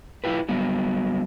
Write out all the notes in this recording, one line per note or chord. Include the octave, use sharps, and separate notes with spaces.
E4 F4 G4 B4
F#3 G3 B3